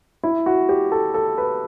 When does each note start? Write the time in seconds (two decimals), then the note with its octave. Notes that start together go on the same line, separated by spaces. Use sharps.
0.23 E4
0.46 F#4
0.69 G4
0.92 A4
1.14 A4
1.38 B4